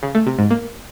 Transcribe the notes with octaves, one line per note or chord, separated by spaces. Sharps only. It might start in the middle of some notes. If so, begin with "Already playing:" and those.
C#3
A3
C3
G#2
A#3